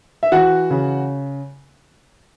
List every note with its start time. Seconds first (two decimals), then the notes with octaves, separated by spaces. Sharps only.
0.23 E5
0.32 E3 F#4 F#5
0.70 C#3